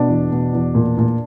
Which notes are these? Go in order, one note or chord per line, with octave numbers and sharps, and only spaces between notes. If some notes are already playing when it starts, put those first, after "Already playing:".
Already playing: B2 D4
E2
B2
E2
A#2
A#2